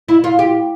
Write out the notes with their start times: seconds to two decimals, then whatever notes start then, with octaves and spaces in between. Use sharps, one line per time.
0.09 E4
0.24 F4
0.39 G4